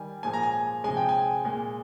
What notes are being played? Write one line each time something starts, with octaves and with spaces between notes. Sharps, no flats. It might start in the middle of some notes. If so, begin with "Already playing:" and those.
Already playing: D#3 G3 G#5
A#2 F3 G#3 G#5
A#5
G#5
C3 F3 G#3 G#5
G5
G#5
A#2 G#3